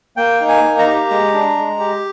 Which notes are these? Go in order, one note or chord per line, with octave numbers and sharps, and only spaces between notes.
A#3 G5
D#4
G#5
A#3
A#5
G4
G#3
D4
G#3
G4